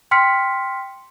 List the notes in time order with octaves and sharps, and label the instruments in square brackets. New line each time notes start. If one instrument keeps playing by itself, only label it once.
[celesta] G5 C6 F6 B6 C#7